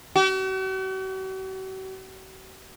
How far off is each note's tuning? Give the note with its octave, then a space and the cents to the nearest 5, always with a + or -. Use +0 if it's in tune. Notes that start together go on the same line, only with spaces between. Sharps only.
F#4 +45